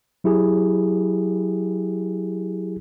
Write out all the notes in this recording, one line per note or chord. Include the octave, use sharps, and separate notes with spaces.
F#3 E4 G4 G#4